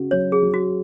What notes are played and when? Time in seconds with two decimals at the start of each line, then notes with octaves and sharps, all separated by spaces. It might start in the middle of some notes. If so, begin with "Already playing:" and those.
Already playing: C#3 F#4
0.11 F#3 C#5
0.32 G#4
0.42 F#3
0.54 F#4